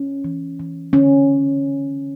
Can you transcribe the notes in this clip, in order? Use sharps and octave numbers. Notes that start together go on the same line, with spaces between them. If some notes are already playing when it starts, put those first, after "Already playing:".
Already playing: C#4
E3
E3
D3 C#4